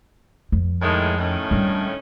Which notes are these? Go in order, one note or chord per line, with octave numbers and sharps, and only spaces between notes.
F2
A2 D#3 G#3
A2 D#3 C#4
G3 D4